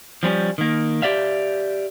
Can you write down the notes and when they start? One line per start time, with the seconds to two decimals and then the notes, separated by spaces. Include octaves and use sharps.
0.23 F3 G3 C4 C#4
0.58 D#3 A#3
1.02 G4 D5 E5 F5